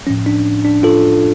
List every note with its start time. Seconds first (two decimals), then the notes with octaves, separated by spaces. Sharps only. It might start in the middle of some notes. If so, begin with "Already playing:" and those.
0.07 A2 F3 C#4
0.26 D4
0.65 D4
0.83 F4 A4